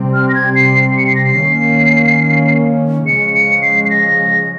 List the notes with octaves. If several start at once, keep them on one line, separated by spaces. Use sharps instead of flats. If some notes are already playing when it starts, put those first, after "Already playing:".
Already playing: C3 G3 C4
F6
A#6
G#6
C7
C#7
C7
A#6
C7
D#3 A#3 C#4
C#3 F3 G#3 C#7
C#7
C7
C7
A#6